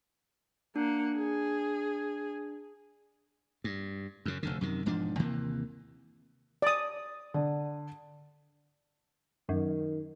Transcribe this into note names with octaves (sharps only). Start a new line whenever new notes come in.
A#3 D4 F#5
G#4
G2
F#2 C#3
F1 D2 D3
F#2 C3 D#3
E1 G#2 F3 D4
D#2 C3 E3 A#3
D5 D#6
D3
F#2 D#3